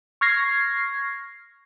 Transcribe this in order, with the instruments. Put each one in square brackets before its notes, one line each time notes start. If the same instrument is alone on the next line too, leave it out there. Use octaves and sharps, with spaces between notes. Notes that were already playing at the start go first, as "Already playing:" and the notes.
[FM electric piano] C#6 F6 G#6 A#6 C7